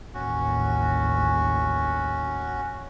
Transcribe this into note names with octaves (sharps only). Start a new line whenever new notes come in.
A1 D#2 C#4 F#4